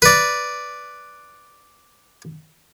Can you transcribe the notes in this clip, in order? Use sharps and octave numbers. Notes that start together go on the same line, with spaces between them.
B4 D5